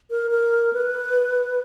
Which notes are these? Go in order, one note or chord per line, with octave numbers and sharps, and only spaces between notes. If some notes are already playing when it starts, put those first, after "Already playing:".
A#4
A#4
B4